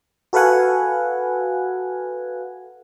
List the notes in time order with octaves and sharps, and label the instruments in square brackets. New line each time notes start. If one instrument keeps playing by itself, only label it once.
[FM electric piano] F#4 A4 B4 F5 F#5 G#5